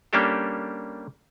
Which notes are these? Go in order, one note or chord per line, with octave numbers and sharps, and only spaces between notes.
G3 A#3 C#4 D4 G4 A4